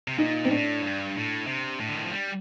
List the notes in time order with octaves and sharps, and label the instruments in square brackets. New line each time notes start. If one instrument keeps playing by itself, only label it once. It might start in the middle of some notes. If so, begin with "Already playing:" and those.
[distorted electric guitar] C3
[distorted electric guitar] A#2 [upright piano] D#4
[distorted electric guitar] A#2 [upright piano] C4
[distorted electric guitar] A2 [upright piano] D4
[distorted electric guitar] G2
A2
C3
A2
D3
D#3
F3
G3